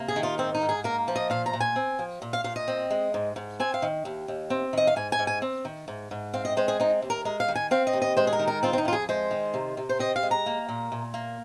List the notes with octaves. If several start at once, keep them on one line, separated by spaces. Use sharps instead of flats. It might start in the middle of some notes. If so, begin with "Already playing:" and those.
Already playing: C3 A#3
G#4
D#3
F4
G#2 C4
D#4
G#2
G#4
A#3 A#4
F3
D#5
A#2 F5
A#5
A#2
G#5
C4
F3
A#2
F5
A#2 F5
D#5
C4
G#3
G#2
G#2
C4 G#5
F5
D#3
D#2
D#2
C4
D#3 D#5
F5
G#2 G#5
G#5
G#2
G#5
C4
D#3
G#2
G#2
C4 F5
D#5
G#3 C5
G#4
C4 D#4
D#2
A#4
G#3 A#4
F5
D#3
G#5
C4 F5
D#5
D#2
D#5
G#3 C5
G#4
A#4
D#3
A#4
C4 F4
C4
D#4
F2 F4
G#4
G#3 C5
D#3
C3
C3
C5
C4 D#5
F5
G#3
A#5
A#3
A#2
A#2
A#3